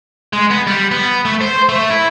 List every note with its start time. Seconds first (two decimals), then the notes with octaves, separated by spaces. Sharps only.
0.33 G#3
0.51 B3
0.67 G3
0.91 B3
1.25 A3
1.41 C5
1.69 A3
1.90 E4